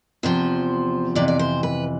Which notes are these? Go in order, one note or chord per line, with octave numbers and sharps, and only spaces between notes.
E2 C3 F3 C5
F2 C3 E3 D5
D5
C5
B4